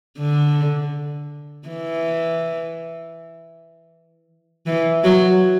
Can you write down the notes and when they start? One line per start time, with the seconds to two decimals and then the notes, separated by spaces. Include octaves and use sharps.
0.19 D3
1.68 E3
4.67 E3
5.04 F#3